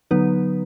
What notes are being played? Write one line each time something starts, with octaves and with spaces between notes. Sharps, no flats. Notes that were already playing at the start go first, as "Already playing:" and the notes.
D3 F#3 B3 D#4 B4